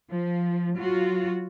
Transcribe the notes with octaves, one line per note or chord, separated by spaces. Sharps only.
F3
F#3 F4 F#4